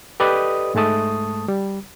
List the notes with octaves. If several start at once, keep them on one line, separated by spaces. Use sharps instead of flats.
G4 A4 B4 D5 D#5 D#6
G#2 G#3 A3 A5 D#6
G3